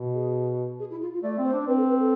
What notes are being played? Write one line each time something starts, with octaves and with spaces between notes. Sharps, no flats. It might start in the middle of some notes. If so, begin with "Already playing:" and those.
Already playing: B2
G#4
G#4
E4
F4
F4
A3 D5
C4
C5
D4
C4 B4
A4
B4
A4